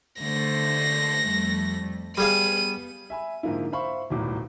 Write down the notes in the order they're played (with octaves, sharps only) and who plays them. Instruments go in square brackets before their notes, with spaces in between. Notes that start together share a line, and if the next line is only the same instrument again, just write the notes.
[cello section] D3 A3 C5 [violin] A#6
[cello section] F2 G3 A3
[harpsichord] G3 G#4 F5 [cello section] B3 [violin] D#7
[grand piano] E5 G#5 B5
G#2 D3 F3 A#3 E4
C5 E5 F5 B5 C#6
D#1 B1 A2 D6